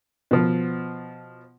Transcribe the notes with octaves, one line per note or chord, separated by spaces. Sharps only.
B2 F3